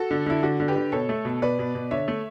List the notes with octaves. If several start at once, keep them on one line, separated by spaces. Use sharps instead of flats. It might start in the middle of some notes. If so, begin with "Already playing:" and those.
Already playing: F#4 A4
D3
D3 E4
D3 F#4
D3
G4 B4
D3
B2 A4 C#5
A3
B2
B2 B4 D5
B2
B2
D3 C#5 E5
A3